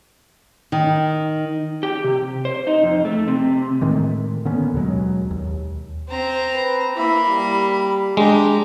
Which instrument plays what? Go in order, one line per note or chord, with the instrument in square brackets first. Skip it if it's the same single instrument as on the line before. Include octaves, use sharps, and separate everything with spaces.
[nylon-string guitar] D#3
[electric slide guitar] G4
C3
C5
D#4
F2
A3
C3
[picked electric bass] A2 D#3 G#3 A3
D3 A#3 B3 C#4
D#2 B2 F#3 G#3
D#2
[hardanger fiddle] C4 A#5
[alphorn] B4
[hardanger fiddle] A#3 B5 [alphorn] E4
[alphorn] G3
[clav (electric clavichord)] G#3 [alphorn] D4 [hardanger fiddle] G4 A#5